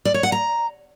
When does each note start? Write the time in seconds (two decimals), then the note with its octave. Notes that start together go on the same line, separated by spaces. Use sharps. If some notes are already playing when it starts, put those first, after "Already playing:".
0.05 D5
0.14 C#5
0.23 F#5
0.32 A#5